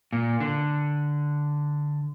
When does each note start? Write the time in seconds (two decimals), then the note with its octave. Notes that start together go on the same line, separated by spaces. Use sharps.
0.13 A#2
0.40 D3